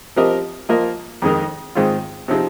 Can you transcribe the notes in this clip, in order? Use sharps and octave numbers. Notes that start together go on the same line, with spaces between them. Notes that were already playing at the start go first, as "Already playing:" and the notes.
F3 C4 G4 A#4 D#5
F3 A#3 F4 A#4 D#5
F2 D#3 G#3 D#4 A#4
G#2 D#3 G#3 C4 F4
C3 F3 C4 D#4 G#4